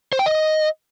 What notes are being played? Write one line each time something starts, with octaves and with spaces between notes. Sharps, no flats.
C5
G5
D#5